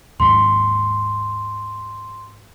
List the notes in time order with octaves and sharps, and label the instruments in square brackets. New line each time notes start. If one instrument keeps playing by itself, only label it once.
[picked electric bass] D#2 G#2 G#3 [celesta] C6